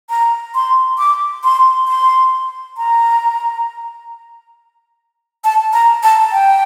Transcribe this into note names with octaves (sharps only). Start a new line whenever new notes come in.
A#5
C6
D6
C6
C6
A#5
A5
A#5
A5
G5